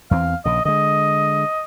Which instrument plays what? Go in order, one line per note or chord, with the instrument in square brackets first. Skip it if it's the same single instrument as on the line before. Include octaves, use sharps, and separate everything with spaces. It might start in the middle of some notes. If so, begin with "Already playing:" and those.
[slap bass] E2 E3 C4 [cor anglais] F5
[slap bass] A#1 C#3 [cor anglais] D#5
[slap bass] D3 G#3 [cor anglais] D#5